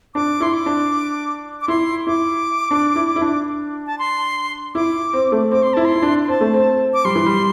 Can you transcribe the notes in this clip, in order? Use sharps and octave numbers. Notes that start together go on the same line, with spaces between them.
D4 D6
E4 C6
D6
D4
D6
E4 C6
E4 D6
D4
E4
E4
D4
A5
C6
E4 D6
C4
A3
C4 D6
C6
E4 A5
C6
E4
D4
C6
C4 A5
A3
C4
D6
G3 C6
E3
G3